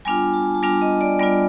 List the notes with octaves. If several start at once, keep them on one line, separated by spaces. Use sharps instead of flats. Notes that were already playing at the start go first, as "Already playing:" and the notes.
G3 B3 D4 F4 G#5
A5
A5
G3 B3 D4 F4 G#5
D#5
D5
G3 B3 D4 F4 D5